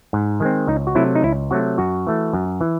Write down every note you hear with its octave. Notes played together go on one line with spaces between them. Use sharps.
G#2
D#3 G#3 C4
C#2 D#4
F#4
C3 F#3 A3 E4
D#4
C#2 E4
C3 F#3 A3 F#4
F#2 F#4
E3 A3
F#2
E3